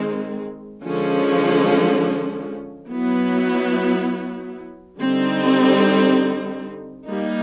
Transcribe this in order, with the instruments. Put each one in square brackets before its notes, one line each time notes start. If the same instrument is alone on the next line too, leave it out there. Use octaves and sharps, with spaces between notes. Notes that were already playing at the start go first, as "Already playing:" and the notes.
Already playing: [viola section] D#3 G#3 C4
D3 F3 G#3 C#4
F#3 B3 E4
D3 G3 C4 D#4
G3 A#3 D#4